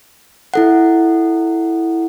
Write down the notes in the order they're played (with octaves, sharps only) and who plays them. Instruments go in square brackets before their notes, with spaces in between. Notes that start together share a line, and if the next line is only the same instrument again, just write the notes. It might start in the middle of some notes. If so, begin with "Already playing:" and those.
[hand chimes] E4 A4 F#5